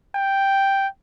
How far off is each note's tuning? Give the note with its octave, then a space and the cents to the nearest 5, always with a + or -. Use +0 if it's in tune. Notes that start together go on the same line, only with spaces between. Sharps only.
G5 +0